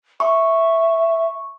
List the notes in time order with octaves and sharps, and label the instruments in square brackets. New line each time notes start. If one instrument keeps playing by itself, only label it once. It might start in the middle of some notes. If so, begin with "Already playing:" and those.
[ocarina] E5 [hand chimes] C#6